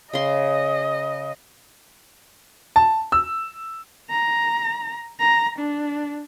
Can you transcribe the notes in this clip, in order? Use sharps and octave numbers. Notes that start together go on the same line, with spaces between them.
C#3 D#5 C6
A5
E6
A#5
A#5
D4